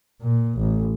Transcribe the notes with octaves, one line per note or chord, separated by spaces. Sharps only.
A#2
A1